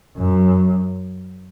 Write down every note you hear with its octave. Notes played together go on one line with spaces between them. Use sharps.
F#2